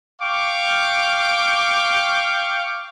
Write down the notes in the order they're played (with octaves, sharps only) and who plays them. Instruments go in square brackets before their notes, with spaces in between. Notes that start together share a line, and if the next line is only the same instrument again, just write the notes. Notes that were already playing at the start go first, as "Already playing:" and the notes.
[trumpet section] F5 G5 C#6 D6